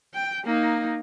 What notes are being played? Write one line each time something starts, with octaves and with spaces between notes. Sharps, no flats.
G5
A#3 D#4